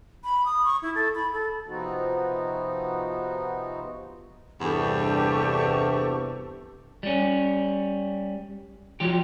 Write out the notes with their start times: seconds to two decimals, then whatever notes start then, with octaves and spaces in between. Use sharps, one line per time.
0.24 B5
0.45 D#6
0.65 C#6
0.82 E4
0.95 A4
1.15 B5
1.33 A4
1.67 C3 F3 B3 C4 D#4 F#4
4.60 E2 G2 C3 G4 A4 C#6
7.03 G3 C#4
9.00 F3 F#3 G4